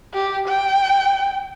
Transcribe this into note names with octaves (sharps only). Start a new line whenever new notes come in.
G4
G5